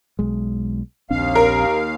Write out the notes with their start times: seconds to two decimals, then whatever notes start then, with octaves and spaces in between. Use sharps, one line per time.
0.19 B1 G#3
1.10 A#1 D#2 C4 D4 F5
1.35 A#4